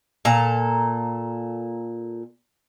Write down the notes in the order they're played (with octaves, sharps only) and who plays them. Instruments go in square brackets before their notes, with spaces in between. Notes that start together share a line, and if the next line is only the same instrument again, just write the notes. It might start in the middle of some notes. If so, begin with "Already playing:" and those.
[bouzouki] A#2 A4 A#5